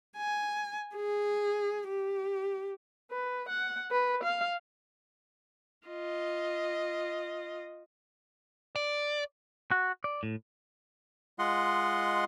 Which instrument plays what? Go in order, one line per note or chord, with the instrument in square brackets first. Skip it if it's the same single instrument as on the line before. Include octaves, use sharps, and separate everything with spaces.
[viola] G#5
G#4
G4
B4
F#5
B4
F5
F4 D#5
[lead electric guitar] D5
[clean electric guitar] F#4
D5
A2
[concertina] G#3 F4 D#5 F#5 C6